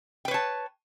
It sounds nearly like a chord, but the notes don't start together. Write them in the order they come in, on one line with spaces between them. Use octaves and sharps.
G5 B4 C#5 A5